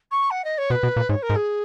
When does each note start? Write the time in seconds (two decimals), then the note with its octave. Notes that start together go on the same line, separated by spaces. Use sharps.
0.11 C#6
0.30 F#5
0.44 D#5
0.58 C#5
0.70 B2 B4
0.83 B2
0.96 A#2
1.09 G#2 C#5
1.22 A#4
1.30 G#2
1.36 G#4